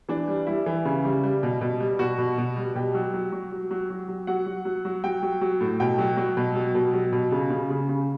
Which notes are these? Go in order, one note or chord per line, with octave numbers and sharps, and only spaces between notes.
E3 D4
G3
G3 E4
E3
C#3
G3
G3
B2
B2
G3
B2 F#4
B2
B2
G3
B2 G4
F#3
F#3
F#3
F#3
F#3
F#3
F#3
F#3 F#5
F#3
F#3
F#3
F#3 G5
F#3
F#3
A2
B2 G5
F#3
F#3
B2
F#3
B2
F#3
B2
C#3
C#3
C#3
C#3